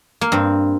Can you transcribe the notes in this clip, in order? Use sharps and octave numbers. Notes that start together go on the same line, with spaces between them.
A#3
G2 C4